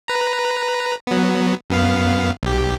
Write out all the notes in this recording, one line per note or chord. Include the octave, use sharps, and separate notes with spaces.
B4 A#5
F#3 B3
F#2 B3 F5
B1 G4